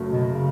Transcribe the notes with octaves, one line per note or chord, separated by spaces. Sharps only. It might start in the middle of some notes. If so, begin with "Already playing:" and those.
Already playing: F#1 F#2 F#3 A3
B2
C#3